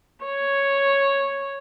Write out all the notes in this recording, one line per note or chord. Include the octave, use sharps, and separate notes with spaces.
C#5